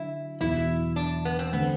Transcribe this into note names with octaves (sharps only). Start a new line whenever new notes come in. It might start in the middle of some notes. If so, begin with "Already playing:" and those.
Already playing: D3 F#3 E4
E2 B2 F#3 E4
D4
B3
C4
D3 A3 B3 C4